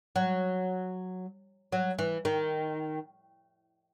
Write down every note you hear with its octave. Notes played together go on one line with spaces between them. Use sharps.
F#3
F#3
E3
D#3